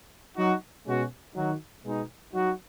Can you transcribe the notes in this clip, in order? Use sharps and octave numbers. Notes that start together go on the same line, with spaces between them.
F#3 D#4 F#4
B2 G#3 C#4 F#4
D#3 F#3 D#4 F#4
B2 G#3 B3 D#4
F#3 D#4 F#4